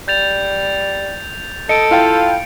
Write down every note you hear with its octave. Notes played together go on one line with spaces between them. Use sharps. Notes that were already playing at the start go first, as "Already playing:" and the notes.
G3 G6 A6 F7
A4 D#5 C#7 D7
E4 F4 F5 G5